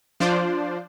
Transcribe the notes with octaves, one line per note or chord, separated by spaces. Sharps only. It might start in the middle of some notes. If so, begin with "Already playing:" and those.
F3 D4 F4 C5 D5